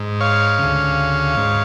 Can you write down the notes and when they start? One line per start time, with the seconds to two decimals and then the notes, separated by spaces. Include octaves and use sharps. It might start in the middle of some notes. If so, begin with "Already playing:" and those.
Already playing: G#2
0.20 C#5 F5
0.59 D2 C#3
1.37 G#2